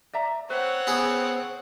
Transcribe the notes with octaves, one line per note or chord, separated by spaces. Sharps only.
D5 E5 A#5
C4 B4 C#5 F#5
B3 C#4 G#4